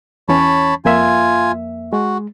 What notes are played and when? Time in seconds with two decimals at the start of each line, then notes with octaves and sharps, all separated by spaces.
0.29 E2 E3 C#4 C#5 A5 B5
0.85 F2 A#3 F4 E5 G#5
1.93 G#3 F#4